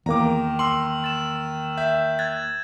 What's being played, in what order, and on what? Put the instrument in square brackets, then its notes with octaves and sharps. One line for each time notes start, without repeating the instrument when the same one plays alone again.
[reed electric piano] E2 A#3 [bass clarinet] D#3 [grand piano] A#5 D6
[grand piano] C6 [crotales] E6 F#7
[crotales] A6 E7
[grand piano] E5 [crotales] G6
[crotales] F#6 G#6 A6